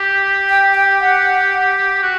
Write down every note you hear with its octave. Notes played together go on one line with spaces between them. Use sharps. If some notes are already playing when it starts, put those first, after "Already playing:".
Already playing: G4
G5
G5
F#5
F#4